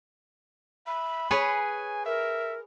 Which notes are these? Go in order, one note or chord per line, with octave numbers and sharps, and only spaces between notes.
E5 B5
G#4 B4 C#5 G#5
A#4 E5